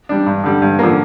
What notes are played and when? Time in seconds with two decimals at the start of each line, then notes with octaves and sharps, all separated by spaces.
0.09 G3 D4
0.26 G2
0.44 D3 G3
0.62 G2
0.79 D3 F3 A#3